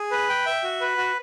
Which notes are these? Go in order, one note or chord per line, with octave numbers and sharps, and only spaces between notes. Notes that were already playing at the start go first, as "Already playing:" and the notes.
Already playing: G#4
B4
G5
E5
F#4
B4
F#4